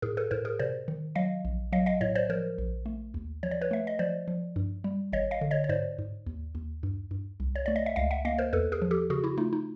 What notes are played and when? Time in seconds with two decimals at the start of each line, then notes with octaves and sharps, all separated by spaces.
0.02 A2 G#4 A#4
0.17 A4 B4
0.31 A2 A#4 C5
0.45 G#4 A#4
0.59 C3 C5 D5
0.88 D#3
1.15 F#3 D#5 F5
1.45 A#1
1.72 F#3 D#5 F5
1.86 D#5 F5
2.01 A2 C#5 D#5
2.15 C5 D5
2.29 F3 A#4 C5
2.58 A#1
2.86 A3
3.14 D#2
3.43 F3 C#5
3.51 D5
3.61 B4 C#5
3.71 A3 E5
3.87 D#5
3.99 F3 C5 D5
4.28 F3
4.56 G2
4.84 G3
5.13 G#1 C#5 D#5
5.31 D#5 F5
5.41 D3
5.51 C#5 D#5
5.64 C#5
5.69 G#2 C5 D5
5.99 G#2
6.26 D#2
6.55 D#2
6.83 G2
7.11 G2
7.40 C2
7.56 C#5
7.66 A3 D5
7.76 D#5
7.86 E5
7.96 C#2 D#5 F5
8.11 E5 F#5
8.25 A#3 D#5 F5
8.38 A#4 C5
8.53 E2 A4 B4
8.72 G#4 A#4
8.82 F3
8.91 G4 A4
9.10 C#3 F#4 G#4
9.24 E4 F#4
9.38 A3 D#4 F4
9.53 D#4